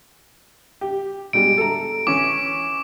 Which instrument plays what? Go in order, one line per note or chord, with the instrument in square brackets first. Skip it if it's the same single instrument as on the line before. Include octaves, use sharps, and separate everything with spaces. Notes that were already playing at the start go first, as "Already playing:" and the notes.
[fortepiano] G4
[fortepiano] B2 G3 G#3 [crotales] D7
[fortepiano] A4 A#5
[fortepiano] E3 C#4 [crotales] D6